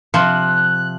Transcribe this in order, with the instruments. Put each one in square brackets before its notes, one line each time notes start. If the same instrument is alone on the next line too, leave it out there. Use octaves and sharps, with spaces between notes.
[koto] C3 F3 [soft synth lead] F#6